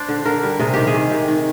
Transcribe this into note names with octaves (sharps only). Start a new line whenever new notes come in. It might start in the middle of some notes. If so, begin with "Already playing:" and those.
Already playing: D4 C5 D5
D3
D3 A#4
G3
C3 G#4
D#3 G4
G#4
D#3
C3
D#3